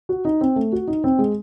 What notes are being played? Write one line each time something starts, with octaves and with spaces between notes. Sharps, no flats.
F#4
D#4
C4
A3
F#4
D#4
C4
G#3